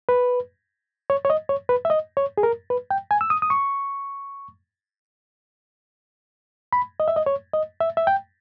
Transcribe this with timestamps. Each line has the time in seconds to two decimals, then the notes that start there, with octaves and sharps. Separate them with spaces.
0.09 B4
1.10 C#5
1.25 C#5
1.30 D#5
1.49 C#5
1.69 B4
1.85 E5
1.90 D#5
2.17 C#5
2.38 G#4
2.43 A#4
2.70 B4
2.91 G5
3.11 G#5
3.21 E6
3.30 D#6
3.42 D#6
3.50 C#6
6.73 B5
7.00 D#5
7.08 E5
7.16 D#5
7.26 C#5
7.53 D#5
7.80 E5
7.97 E5
8.07 G5